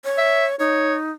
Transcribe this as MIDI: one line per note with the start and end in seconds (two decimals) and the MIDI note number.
0.04 0.55 73
0.18 0.46 76
0.59 1.11 63
0.59 0.95 73